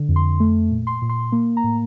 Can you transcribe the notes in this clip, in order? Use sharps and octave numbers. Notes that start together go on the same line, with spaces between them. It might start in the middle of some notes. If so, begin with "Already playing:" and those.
Already playing: D3
F2
C6
A3
A#2
C6
A#2
C6
A#3
A#5
A2